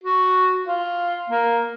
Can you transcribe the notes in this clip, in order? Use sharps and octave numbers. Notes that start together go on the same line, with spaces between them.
F#4
F4
A#3